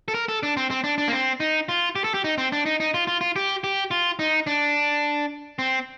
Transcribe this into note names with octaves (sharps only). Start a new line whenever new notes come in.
A4
A#4
A4
D4
C4
C4
D4
D4
A#3
C4
D#4
F4
G4
A4
G4
D#4
C4
D4
D#4
D#4
F4
F4
F4
G4
G4
F4
D#4
D4
C4